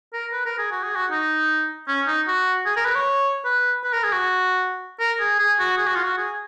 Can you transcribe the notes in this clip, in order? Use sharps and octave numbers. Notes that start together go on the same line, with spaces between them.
A#4
B4
A#4
G#4
F#4
G#4
F#4
D#4
C#4
D#4
F#4
G#4
A#4
B4
C#5
B4
B4
A#4
G#4
F#4
A#4
G#4
G#4
F#4
G#4
F#4
F4
F#4
G#4